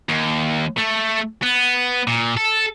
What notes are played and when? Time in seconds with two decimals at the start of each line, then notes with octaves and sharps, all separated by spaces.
0.09 D#2
0.78 A3
1.43 B3
2.07 A#2
2.37 A4